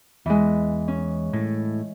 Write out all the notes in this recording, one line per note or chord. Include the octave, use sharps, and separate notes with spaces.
E2 E3 G#3
C#4
A2